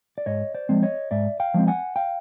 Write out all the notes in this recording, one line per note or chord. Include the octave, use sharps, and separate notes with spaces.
D5
G#2 C#5 D#5
C5 D5
F3 G#3 C4
C#5 D#5
G#2 D5 E5
F5 G5
F3 G#3 C4
F#5 G#5
F5 G5